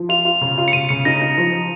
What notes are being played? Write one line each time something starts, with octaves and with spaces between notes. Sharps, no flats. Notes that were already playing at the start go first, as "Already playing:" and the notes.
Already playing: F3
F4 F7
F4
C#3
F4
C#7
C#3 D#7
C#3 C#7
D#4 A#6
D#4
F3